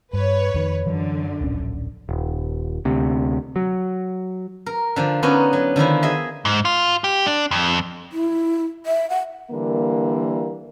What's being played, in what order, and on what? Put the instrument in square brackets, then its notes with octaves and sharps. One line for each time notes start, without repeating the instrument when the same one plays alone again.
[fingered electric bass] G2 [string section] B4 C#5
[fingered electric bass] F2 D#3
[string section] F#2 D3 [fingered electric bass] E3 F#3
[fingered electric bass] D1 A#1 C#4
[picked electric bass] D#1
D2 C3
F#3
[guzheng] A#4
D3 F3 D4
D3 B3 C#4 D#4 D#5
F#3
D3 D#3 F3 E4
G#4 D#5 E5
[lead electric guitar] G#2
F4
G4
D4
F2
[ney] E4
E5
F#5
[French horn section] D3 E3 G3 A#3